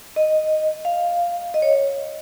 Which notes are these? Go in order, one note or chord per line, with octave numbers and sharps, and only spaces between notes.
D#5
F5
D#5
C#5